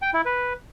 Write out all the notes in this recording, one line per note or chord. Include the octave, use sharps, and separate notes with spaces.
G5
E4
B4